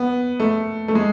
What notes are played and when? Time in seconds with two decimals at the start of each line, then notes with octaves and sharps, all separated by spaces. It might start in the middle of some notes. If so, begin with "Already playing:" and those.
Already playing: B3
0.40 A3
0.88 A3
0.95 G#3